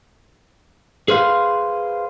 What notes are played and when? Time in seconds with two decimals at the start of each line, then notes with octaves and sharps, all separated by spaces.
1.08 G#4 B4 C5 F5